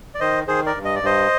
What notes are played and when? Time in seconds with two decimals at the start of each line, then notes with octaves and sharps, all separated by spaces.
0.15 D5
0.20 D#3 C5 D#5
0.48 D#3 G#4 C5
0.66 A#4 D5
0.75 G2
0.85 D#5
0.95 D5
1.03 G2 C5 D#5